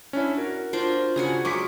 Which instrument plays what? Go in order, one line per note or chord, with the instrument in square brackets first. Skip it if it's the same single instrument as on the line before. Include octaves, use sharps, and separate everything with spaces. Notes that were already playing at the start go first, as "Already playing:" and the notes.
[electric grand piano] C#4 D4 E4
F#4 A#4
[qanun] D4 F4 C5
[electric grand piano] C#3 C#7 [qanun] F#4 G#5 A#5
[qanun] F#3 G#3 A#4 [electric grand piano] C#6 D6 B6